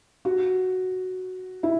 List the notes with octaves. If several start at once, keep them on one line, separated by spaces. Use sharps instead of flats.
F#4
E4